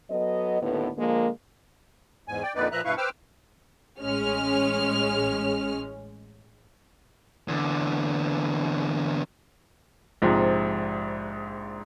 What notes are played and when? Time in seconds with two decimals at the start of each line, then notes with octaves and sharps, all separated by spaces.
0.10 F#3 B3 A4 D#5
0.62 D#2 A2 D3 B3
0.97 D3 F3 G#3 A#3
2.28 E2 G#2 G#5
2.43 D5 G5
2.55 F2 A#2 D3 D#4 B4 D5
2.72 A#2 F3 B4 E5 A#5 F#6
2.85 G2 B2 E4 B4 F5 C#6
2.97 B4 C5 G5 D6 E6 F6
4.00 A1 G#3 C#4 F6
7.48 E2 D3
10.22 A#1 G#2 C3 F3